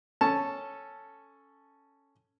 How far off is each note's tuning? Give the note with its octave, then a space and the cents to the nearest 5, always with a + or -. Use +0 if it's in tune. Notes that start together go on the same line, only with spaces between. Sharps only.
C#4 +0 A4 +0 A5 +0